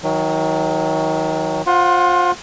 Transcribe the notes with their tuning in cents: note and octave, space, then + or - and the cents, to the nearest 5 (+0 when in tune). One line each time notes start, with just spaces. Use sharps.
D#3 +35 F#3 +0
F4 +25 C5 +10 F#5 +0